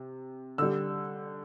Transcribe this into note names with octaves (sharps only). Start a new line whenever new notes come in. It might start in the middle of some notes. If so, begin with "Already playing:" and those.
Already playing: C3
D3 G3 E6